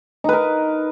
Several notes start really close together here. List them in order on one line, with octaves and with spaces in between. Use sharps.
D#4 B4 A#4